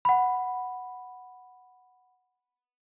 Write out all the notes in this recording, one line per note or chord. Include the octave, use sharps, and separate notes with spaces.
F#5 B5